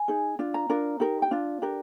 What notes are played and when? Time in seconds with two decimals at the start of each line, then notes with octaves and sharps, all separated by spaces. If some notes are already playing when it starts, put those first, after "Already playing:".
Already playing: G#5
0.08 D#4 G#4
0.39 D4 F4
0.54 A#5
0.69 D4 F4 A#4
1.00 D#4 G4 A#4
1.22 G5
1.31 D4 F4
1.62 D4 G4 A#4